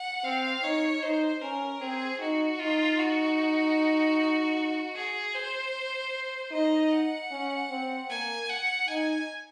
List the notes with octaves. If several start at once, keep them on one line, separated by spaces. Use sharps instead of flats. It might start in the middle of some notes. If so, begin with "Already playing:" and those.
Already playing: F#5
C4 F5
D#4 C#5
D#4 C5
C#4 A#4
C4 G#4
D#4 F#4
D#4 F4
F#4
G#4
C5
D#4 D#5
F#5
C#4
C4
A#3 G#5
F#5
D#4 G#5